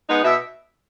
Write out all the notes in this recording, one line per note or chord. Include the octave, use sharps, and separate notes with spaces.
G#3 B3 D#4
B2 E5